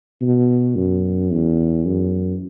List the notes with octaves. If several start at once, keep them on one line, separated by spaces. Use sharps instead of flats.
B2
F#2
E2
F#2